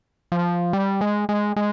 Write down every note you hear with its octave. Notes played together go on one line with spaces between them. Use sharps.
F3
G3
G#3
G#3
G#3